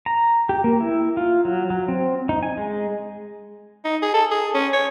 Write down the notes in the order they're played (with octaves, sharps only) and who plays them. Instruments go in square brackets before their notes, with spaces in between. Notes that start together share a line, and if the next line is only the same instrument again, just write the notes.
[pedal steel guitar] A#5
G4
A#3
E4
F4
F#3
F#3
C4
D#4
G#5
G#3
[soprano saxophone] D#4
G#4
A4
G#4
C#4
C#5